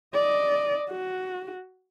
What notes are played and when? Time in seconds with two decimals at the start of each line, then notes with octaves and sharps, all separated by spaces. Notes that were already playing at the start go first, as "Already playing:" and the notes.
0.14 D5 D#5
0.90 F#4